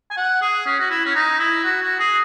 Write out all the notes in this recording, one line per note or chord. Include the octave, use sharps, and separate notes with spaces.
G#5
F#5
G#4
C#4
F#4
E4
C#4
D#4
E4
F#4
F#4
G#4